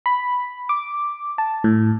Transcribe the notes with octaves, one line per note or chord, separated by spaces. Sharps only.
B5
D6
A5
A2